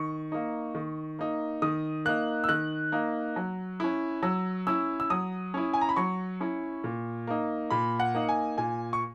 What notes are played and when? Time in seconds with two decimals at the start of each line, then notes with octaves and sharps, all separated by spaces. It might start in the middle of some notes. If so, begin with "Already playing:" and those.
Already playing: D#3 C#6
0.32 A#3 D#4
0.75 D#3
1.19 A#3 D#4
1.62 D#3 D#6
2.05 A#3 D#4 F#6
2.44 E6
2.49 D#3 F#6
2.92 A#3 D#4
3.36 F#3
3.80 C#4 E4
4.23 F#3 E6
4.67 C#4 E4 E6
5.00 E6
5.10 F#3 D#6
5.54 C#4 E4
5.74 G#5
5.81 A#5
5.89 B5
5.96 F#3 C#6
6.41 C#4 E4
6.84 A#2
7.27 A#3 D#4
7.71 A#2 B5
8.00 F#5
8.14 A#3 D#4
8.29 G#5
8.58 A#2 G#5
8.93 C#6